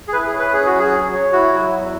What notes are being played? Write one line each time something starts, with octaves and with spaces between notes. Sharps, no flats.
G#4
E4 B4
G#4
C#5
B4
C#4 G#4
F#4
F#3
G#4
C#5
C#5
E4 F#4
F#3
E2